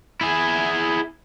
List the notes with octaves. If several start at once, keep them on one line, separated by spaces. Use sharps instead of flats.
E4 G#4